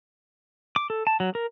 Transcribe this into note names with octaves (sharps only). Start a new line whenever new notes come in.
D6
A4
A5
F#3
A#4